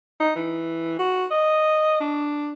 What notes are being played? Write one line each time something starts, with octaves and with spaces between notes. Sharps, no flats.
D#4
E3
F#4
D#5
D4